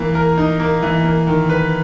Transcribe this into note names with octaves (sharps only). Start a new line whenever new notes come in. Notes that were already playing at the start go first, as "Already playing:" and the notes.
Already playing: E3 A#3
A#4
D#4
A#3
E3
A#3
D#3
B4